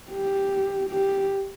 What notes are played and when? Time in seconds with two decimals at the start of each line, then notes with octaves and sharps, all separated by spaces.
0.12 G4
0.90 G4